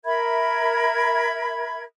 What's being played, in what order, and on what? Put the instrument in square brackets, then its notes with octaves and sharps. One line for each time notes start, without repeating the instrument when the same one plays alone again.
[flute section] A#4 E5 B5 G#6